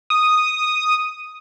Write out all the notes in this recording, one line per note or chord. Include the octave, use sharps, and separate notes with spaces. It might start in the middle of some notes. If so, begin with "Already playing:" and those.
D#6